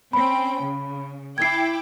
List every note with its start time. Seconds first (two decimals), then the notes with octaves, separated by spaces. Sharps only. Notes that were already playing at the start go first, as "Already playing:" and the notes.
0.13 C4 C#4 G5 B5
0.63 C#3
1.38 E4 G5 D6 G#6 C7